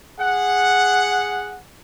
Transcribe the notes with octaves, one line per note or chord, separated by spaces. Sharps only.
G#4 F#5